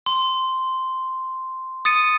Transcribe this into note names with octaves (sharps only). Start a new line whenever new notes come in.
C6
D#6 A6 C#7 D#7